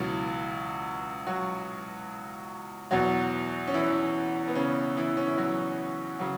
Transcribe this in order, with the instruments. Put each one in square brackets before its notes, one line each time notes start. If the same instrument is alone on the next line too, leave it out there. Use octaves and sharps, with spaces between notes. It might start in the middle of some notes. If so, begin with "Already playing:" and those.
Already playing: [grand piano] C#2 B2 E3 F#3 E4
F#3 F#4
E2 B2 F#3 F#4
C#4
E3 E4
B3
C#3 C#4
E3 E4
C#4
E4
F#3 F#4
C#3 F#3